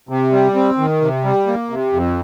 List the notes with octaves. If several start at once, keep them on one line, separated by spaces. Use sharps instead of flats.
C3
G3
C4
D#3
C3
G3
A#3
C3
F2